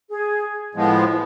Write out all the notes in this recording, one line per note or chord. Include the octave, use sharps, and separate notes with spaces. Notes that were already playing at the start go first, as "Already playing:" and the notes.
G#4
A2 F3 G#3 B3